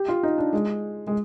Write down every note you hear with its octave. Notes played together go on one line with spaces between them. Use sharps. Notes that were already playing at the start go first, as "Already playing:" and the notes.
Already playing: G4
F4
D#4
D4
G#3
G#3